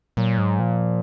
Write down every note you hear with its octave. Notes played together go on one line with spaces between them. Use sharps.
A#2 F#3
G#2
A#2 F3